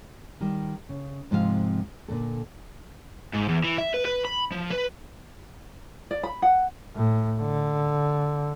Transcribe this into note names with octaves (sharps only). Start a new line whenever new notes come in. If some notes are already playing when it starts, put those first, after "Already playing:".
D#3 G3
C#3
G#2 C3 F3 C4 G4 F5
A#2 D3 A4
G#2
E2
E3
E5
B4
B4
B5
F3
B4
D5
B5
F#5
A2
D3